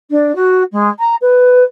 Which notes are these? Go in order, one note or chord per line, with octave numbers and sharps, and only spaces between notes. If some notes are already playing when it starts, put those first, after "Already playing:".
D4
F#4
G#3
A#5
B4